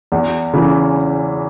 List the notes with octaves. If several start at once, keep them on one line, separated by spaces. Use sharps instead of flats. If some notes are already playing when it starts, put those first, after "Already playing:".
E2
C#3 E3